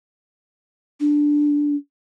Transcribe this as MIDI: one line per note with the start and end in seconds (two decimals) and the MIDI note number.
1.00 1.76 62